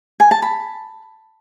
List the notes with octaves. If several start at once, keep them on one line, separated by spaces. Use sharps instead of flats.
G#5
A5
B5